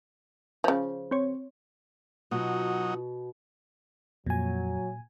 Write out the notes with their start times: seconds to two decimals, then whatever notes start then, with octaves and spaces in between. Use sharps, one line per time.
0.64 C#3 F3
1.11 C4 C#5
2.31 B2 F#3 D#4 F4
4.26 F2 A#2 F#3 G#5